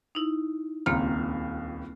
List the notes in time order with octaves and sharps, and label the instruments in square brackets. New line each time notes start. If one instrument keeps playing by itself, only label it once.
[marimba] D#4 E4
[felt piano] D#1 C#2 F6 [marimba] A#3 C4 A#5